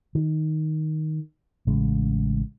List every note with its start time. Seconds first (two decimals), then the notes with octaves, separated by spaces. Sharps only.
0.15 D#3
1.67 A1 C#3 G#3